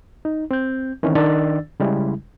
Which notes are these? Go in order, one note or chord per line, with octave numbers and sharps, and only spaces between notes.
D#4
C4 G6
D#3 E3 C4 C#4
D#3 D4 D5 E6 A6
C#3 G3 G#3 E4